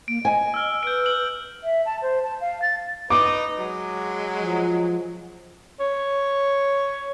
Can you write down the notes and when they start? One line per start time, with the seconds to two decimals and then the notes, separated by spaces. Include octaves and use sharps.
0.08 A#3 D7
0.25 D#5 G#5
0.54 E6 F6
0.83 B4 G6 D7
1.06 F#7
1.64 E5
1.86 A5
2.02 C5
2.23 A5
2.41 F5
2.62 A6
3.10 D#4 B4 D#5 D6
3.59 F#3 G#3
4.42 F3
5.80 C#5